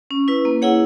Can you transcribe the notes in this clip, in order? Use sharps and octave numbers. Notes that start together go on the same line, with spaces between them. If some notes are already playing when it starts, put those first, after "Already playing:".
C#4
E4 B4
A#3
E4 G#4 C#5 F#5